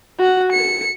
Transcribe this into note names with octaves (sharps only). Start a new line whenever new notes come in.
F#4 F#5
C#7